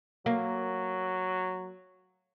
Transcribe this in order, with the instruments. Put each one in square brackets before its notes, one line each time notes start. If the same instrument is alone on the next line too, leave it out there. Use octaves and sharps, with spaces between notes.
[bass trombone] F#3 [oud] A#3